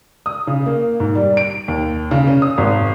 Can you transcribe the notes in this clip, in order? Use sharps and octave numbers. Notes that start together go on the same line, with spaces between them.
D#6
C#3
A#3
G#2
G3
D7
D#2
C#3
C#4
D#6
G#1